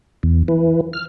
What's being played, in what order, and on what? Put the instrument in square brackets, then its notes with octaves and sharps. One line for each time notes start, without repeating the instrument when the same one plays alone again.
[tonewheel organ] E2
E3
F6